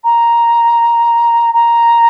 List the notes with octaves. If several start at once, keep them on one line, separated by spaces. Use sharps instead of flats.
A#5
A#5